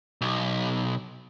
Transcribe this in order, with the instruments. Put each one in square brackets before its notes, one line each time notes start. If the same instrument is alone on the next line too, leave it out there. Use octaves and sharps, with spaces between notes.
[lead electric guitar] B1